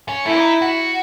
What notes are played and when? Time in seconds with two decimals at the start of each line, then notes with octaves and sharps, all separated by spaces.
0.09 C#4
0.25 A3 E4
0.38 D#4
0.62 F#4